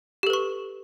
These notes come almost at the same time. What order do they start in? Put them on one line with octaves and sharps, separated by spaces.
G4 A4 B4 C#6